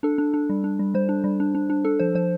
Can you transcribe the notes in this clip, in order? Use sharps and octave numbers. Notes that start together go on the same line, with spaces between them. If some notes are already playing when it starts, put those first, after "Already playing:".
D4 A4
D4
D4
G3
D4
G3
G3 C5
D4
G3
D4
D4
D4
D4 A4
F3 C5
F3 C5